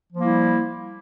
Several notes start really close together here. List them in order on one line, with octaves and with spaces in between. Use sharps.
F3 A#3 G3 E4